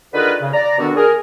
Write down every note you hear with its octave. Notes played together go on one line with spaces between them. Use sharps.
D3 D#3 F4 G#4 A#4 B4
C#3
D5 A#5
B2 D3 D#3 B3 D4 F#4
G#4 A#4